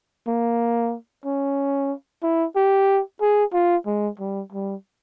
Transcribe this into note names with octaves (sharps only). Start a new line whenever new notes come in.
A#3
C#4
E4
G4
G#4
F4
G#3
G3
G3